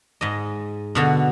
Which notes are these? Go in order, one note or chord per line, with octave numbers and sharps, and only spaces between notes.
G#2 D#5
B2 D3 F#4